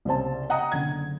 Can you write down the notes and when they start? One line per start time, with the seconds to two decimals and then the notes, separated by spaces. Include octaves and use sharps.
0.05 C2 C#3 C4 C5 A5
0.50 D#5 F#5 G5 A#5 D#6
0.72 F#1 D3 G#6